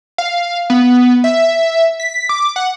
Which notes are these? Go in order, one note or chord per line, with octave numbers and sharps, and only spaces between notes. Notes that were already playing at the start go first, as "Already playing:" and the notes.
F5
B3
E5
B6
D6
F#5